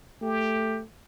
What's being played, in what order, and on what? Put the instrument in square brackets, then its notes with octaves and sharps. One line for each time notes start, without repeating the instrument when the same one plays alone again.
[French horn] A3 [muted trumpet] G4